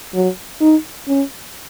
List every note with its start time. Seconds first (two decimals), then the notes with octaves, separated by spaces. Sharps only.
0.14 F#3
0.61 D#4
1.08 C#4